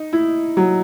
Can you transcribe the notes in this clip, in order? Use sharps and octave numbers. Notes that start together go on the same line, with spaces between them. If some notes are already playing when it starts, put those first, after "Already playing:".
Already playing: D#4
E4
F#3